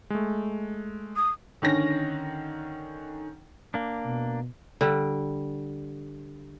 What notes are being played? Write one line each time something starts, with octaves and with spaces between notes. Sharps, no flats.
G#3 A3
D#6
D3 D#3 C#4 A#6
A#3 D4
B2
D3 G3